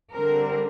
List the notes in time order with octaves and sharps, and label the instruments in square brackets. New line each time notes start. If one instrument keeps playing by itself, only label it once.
[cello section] D3 G3 C4 A#4